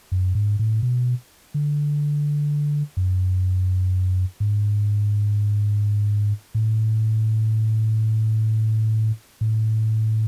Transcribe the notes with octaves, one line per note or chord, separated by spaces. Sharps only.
F#2
G#2
A2
B2
D3
F#2
G#2
A2
A2